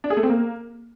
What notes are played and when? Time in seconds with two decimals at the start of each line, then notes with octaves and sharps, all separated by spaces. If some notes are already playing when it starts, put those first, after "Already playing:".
0.04 D4
0.10 G#4
0.17 A3
0.23 C4
0.30 A#3